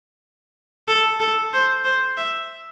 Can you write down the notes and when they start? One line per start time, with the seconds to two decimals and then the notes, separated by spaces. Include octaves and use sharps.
0.88 A4
1.20 A4
1.53 C5
1.85 C5
2.17 E5